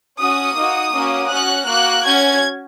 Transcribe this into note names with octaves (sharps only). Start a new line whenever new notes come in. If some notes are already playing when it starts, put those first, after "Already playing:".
C#4 F#4 D#6
A#3 D#4 F#4
A#3 C#4 F#4
C#4 F#4 F#6
A#3 F#4 F#6
C#4 F#4 G#6